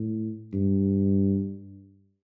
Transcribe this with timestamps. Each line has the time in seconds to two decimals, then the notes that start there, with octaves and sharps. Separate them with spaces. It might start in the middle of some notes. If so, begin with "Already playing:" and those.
Already playing: A2
0.54 G2